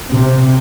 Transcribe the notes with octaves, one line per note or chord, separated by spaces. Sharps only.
C3